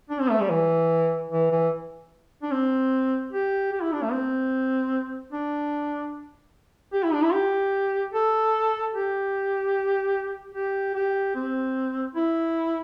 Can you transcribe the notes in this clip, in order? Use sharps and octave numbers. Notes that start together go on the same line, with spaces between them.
D4
C4
A3
G3
E3
E3
E3
D4
C4
G4
G4
E4
D4
A3
C4
D4
G4
E4
D4
E4
G4
A4
G4
G4
G4
C4
E4